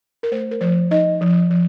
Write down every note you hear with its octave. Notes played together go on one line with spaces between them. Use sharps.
A#4
A3 C5
A#4
F3 C5
D#4 D#5
F3
F3